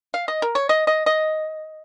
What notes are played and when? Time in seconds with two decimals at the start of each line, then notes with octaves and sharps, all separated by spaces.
0.14 F5
0.28 D#5
0.42 A#4
0.55 C#5
0.69 D#5
0.87 D#5
1.06 D#5